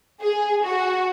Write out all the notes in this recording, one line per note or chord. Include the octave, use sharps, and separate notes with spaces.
G#4
F#4